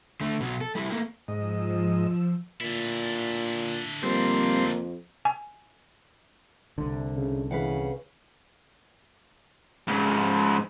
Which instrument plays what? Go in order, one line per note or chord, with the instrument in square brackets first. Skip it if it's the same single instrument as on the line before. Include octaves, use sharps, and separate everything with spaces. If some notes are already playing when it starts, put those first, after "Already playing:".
[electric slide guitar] D3 A3
B2 F#3
A4
G3 E4 G4
A3 A#3 G4
[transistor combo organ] G#2 D#5 [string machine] F3 E6
[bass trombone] A#2 [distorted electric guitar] D3 E4
[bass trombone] F2 [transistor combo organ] G3 C4 [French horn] A#3
[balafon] G#5
[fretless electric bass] C2 D3
[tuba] C#3
[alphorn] C#3 [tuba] E3 [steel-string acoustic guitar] B4 F5 F#5
[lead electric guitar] G#2 C#3